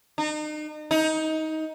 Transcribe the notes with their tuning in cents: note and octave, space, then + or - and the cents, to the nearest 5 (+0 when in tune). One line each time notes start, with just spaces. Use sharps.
D#4 -40
D#4 +20